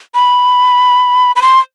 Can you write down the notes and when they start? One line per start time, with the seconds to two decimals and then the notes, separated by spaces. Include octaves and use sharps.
0.15 B5
1.36 B5
1.42 C6